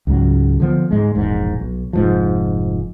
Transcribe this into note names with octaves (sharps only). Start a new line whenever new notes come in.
C#2 G#2 F#3
D3 F3 B3
G#2 G#3
E1 A#1 G#2
B1
F1 G#2 F3